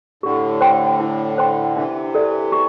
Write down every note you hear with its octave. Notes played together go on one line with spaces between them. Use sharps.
A2 D3 G4
C5 G5 C6
E4
C5 G5 C6
C3 E3 D4
A4 D5
G4